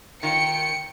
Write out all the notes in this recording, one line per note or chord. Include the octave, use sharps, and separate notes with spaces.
D#3 F4 G5 C#7